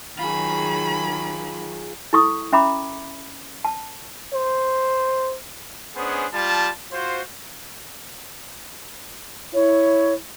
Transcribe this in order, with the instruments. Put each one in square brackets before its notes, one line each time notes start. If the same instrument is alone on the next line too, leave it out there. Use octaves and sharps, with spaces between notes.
[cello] D#3 F#3 [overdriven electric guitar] F4 G#4 [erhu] B5
[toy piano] E4 A4 C#6 D#6
C#4 E5 A#5 B5 D6
A5
[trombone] C5
[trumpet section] B3 C#4 D4 G#4 C5
G3 F4 A5
F4 F#4 C5
[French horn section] E4 [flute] C#5